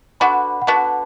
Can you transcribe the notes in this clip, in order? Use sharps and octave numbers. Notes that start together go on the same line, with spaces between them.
D3 B3 F#4 B5
F#5
D3 B3 F#4 A5